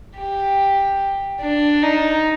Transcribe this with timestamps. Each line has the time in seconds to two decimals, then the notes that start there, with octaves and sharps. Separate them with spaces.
0.18 G4
1.41 D4
1.83 D#4